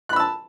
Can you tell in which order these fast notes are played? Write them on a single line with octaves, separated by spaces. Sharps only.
F#6 B5 E6 A5